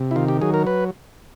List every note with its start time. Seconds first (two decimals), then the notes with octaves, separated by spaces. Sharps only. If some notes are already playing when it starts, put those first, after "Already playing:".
Already playing: C3
0.11 E4
0.16 D#3 F4
0.28 G4
0.41 F#3 G#4
0.54 A#4
0.67 B4